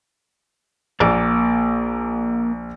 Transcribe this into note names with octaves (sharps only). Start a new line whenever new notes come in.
A#1 A#3 D5